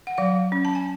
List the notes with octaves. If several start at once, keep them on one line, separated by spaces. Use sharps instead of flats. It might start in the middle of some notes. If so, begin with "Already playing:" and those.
F#5
F#3 F5
C#4
A5
G#5